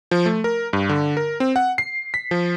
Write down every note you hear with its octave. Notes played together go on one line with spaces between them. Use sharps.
F3
A3
A#4
G2
D3
A#4
C4
F#5
C7
B6
F3